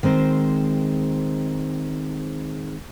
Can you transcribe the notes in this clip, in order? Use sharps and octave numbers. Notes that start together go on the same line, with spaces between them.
D#3 G#3 C4 C5